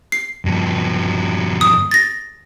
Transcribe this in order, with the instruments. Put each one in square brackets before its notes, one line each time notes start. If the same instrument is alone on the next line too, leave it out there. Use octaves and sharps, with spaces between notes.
[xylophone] C7
[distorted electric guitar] G2 F3
[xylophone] D#6
A6 A#6